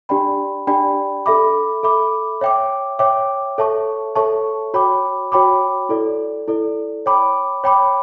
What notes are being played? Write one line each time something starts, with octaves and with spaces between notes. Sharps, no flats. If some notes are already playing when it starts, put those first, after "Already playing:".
D4 G4 D5 G5 B5
D4 G4 D5 G5 B5
A4 E5 B5 D6
A4 E5 B5 D6
C#5 E5 G5 D6
C#5 E5 G5 D6
A4 C#5 E5 A5 C#6
A4 C#5 E5 A5 C#6
F#4 C#5 G5 B5 D6
F#4 C#5 G5 B5 D6
E4 A4 D5
E4 A4 D5
C#5 G5 B5 D6
C#5 G5 B5 D6